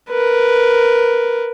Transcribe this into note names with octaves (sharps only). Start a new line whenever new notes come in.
A#4 B4